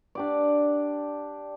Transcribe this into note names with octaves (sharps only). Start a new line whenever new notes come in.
D4 G4 D5